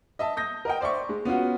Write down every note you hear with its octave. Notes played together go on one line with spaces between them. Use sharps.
D#5 E5 A5
D#6 G6 A#6
A#4 D#5 G5
C5 D5 E5 C#6
G#3
B3 C#4 F4 F#4